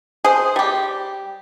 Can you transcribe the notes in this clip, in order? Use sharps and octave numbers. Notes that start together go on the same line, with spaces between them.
G#4 C5
G3 G4